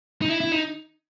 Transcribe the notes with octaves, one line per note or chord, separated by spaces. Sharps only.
D#4
E4
E4
D#4